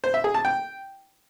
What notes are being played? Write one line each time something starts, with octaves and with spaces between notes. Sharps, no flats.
C5
E5
G#4
A5
G5